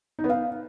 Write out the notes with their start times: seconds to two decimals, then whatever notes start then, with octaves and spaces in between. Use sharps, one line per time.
0.19 D#4
0.24 B3
0.30 F5